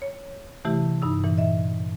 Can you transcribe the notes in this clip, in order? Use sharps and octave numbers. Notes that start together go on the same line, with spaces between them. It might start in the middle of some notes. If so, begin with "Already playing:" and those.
C#5
C3 E3 A3 E4 G4
G2 D#4 E6
A#2 E3
D#5 E5